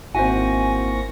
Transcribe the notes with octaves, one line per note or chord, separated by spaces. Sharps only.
G#1 A#3 C4 E4 F#4 G#5 C#6 A#6